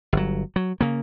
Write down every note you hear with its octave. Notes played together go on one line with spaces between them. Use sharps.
G1 F#3
F#3
C#3 A#3